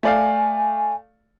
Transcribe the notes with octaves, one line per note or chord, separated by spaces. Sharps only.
A3 D5 F5 G#5